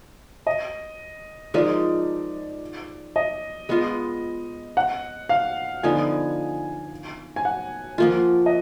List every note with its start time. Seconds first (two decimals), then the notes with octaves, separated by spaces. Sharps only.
0.47 D#5
1.54 F3 G#3 D#4 A#4 D5
3.16 D#5
3.69 G#3 B3 F4
4.77 F#5
5.29 F5
5.83 D3 F3 B3 D#4 G#5
7.36 G#5
7.45 F#5
7.98 F3 A#3 F4
8.46 D#5